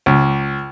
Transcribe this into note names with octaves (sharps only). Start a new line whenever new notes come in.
C#2